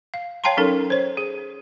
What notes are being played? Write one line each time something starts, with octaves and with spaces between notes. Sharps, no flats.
F5
C#5 F5 G5 A5 A#5 C6
F#3 C#4 D#4 A4 A#4
C5 C#5
G#4